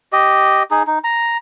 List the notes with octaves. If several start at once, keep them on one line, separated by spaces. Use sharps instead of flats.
G4 D#5
D#4 G#4
D#4
A#5